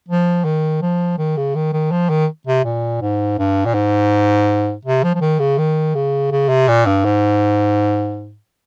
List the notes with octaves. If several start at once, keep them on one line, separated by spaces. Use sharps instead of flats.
F3
D#3
F3
D#3
C#3
D#3
D#3
F3
D#3
C3
A#2
G#2
G2
A#2
G#2
C3
F3
F3
D#3
C#3
D#3
C#3
C#3
C3
A#2
G2
G#2